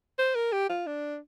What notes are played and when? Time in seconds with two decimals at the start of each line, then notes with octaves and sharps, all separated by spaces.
0.19 C5
0.35 A#4
0.52 G4
0.69 F4
0.86 D4